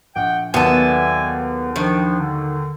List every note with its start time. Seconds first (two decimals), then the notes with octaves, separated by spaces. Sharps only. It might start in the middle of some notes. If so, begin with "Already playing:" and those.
0.16 A#1 F#5 G5
0.54 D#2 F#3 B3 A4 D5 E5 G#5
1.76 D#3 F3 D4
2.20 D3